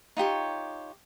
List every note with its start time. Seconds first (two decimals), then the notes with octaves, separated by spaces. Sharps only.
0.17 D#4 F4 G4 C#5